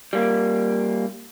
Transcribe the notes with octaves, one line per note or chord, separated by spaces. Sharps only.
G3 A#3